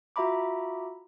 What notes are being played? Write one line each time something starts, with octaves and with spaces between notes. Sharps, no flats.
F4 F#4 E5 A#5 B5 D6